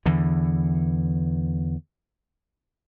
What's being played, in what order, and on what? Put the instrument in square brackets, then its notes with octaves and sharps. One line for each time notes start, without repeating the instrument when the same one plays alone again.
[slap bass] E2 D3 E3